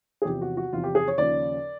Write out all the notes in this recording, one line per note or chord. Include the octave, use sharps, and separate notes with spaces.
G#4
E2 C3 F3 G4
F#4
F#4
E2 C3 F3 F4
G4
G#4
C#5
D#2 C#3 F3 D5